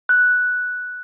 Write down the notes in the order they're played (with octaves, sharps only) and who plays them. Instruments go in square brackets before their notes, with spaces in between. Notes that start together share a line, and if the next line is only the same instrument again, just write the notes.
[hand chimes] F#6